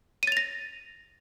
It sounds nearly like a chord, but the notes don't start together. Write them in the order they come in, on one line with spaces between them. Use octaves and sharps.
D#7 A6 F7 A#6